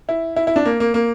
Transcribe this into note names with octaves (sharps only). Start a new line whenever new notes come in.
E4
E4
E4
D4
A#3
A#3
A#3